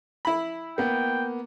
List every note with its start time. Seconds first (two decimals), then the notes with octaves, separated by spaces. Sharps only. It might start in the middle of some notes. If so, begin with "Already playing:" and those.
0.25 E4 B5
0.78 A#3 B3 G5